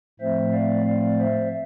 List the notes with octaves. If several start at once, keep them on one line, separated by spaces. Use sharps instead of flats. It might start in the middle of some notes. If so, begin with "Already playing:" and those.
A2 F3 A3 C4 C5 E5
D5 F5
D5 F5
C5 E5